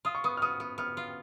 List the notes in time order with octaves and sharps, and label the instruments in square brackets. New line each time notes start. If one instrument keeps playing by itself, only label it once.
[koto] F4 [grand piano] D#6
[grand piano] C#6
[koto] B3 [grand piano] D#6
[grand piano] F6
[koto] B3 [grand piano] D#6
[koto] B3
[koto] B3 [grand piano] F6
[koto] F4